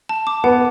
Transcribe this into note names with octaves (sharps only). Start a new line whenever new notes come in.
A5
D6
B3 F#5